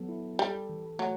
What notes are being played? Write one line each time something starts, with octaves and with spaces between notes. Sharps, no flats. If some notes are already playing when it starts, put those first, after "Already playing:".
Already playing: F#3 B3 A4
E4
G3 A4
E3
F#3 A3